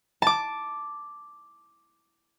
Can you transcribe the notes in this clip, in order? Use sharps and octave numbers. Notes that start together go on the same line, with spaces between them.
A5 D6